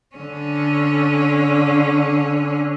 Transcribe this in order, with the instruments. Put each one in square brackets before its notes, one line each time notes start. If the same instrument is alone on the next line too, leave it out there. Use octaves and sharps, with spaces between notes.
[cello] D3 C#4